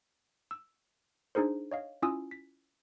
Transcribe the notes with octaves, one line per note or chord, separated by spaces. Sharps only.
E6
D4 D#4 G#4 A#4 C5
C#5 D#5 F5
C#4 E4 F4 G#5 D#6 E6
B6